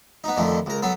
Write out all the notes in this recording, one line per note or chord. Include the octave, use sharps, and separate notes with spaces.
B3 D#4
F2 D3 D#3 A3
C#2 A#4
F#3 B3 A4